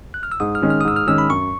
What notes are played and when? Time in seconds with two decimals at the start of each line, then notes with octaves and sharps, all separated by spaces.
0.14 F#6
0.23 F6
0.32 E6
0.40 G#2 D#6
0.55 F6
0.62 D#3 G#3 C#4
0.70 F6
0.81 D#6
0.85 G#2 E6
0.96 F6
1.07 D#3 G#3 C#4 E6
1.18 B5
1.30 F#2 C#6